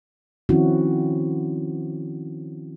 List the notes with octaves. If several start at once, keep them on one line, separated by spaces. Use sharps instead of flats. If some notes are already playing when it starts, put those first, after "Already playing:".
D#3 F3 C4 C#4 E4 F#4